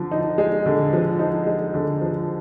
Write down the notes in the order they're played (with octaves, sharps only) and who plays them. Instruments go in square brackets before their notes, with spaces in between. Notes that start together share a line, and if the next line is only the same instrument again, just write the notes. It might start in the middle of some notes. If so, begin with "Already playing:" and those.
Already playing: [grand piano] D3 F3
D#4
G#3
D3
F3
D#4
G#3
D3
F3